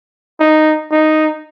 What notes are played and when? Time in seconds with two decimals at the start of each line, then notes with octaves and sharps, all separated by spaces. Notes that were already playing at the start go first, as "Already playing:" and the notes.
0.40 D#4
0.92 D#4